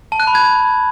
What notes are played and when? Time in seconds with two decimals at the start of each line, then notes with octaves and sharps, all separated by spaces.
0.12 A5
0.20 F#6
0.27 B5
0.35 G#6